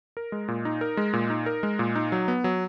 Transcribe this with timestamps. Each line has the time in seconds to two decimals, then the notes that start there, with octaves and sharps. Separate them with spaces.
0.17 A#4
0.32 G#3
0.48 A#2
0.65 D#4
0.81 A#4
0.97 G#3
1.13 A#2
1.30 D#4
1.46 A#4
1.63 G#3
1.79 A#2
1.95 D#4
2.12 F#3
2.28 B3
2.44 F#3